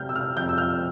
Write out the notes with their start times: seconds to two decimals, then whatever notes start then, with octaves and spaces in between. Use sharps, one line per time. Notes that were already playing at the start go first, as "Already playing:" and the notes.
Already playing: C3 C4 F6 G6
0.09 E6
0.15 F6
0.37 F2 G6
0.49 E6
0.58 F6